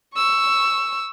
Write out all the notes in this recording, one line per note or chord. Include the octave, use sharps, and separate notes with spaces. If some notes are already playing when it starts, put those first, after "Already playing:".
C#6 E6